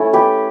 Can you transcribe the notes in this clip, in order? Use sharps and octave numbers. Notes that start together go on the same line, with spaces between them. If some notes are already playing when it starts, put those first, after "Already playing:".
Already playing: A3 C#4 E4 A4
G4 B4